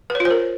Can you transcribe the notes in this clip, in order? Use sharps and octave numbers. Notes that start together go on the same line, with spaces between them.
B4
C#5
F4
C5
A#4